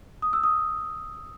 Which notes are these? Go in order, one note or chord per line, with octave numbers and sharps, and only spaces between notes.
D#6
E6
D#6